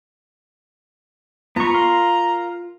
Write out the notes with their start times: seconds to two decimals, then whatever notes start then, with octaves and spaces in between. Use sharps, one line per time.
1.56 B3 F4 A#5 C#6
1.74 A#4 F5 C6